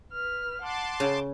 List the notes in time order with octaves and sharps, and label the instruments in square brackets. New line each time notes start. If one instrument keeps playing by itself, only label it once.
[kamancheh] B4 F6
[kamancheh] F#5 F#6 [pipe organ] A5 C6 D6
[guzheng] C#3